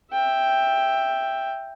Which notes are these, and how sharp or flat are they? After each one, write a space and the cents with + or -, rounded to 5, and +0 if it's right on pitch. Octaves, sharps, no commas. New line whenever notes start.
E5 +0 G5 +5